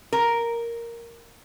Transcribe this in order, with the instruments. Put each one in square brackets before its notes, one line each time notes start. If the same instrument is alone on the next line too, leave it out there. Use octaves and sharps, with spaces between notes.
[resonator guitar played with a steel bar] A#4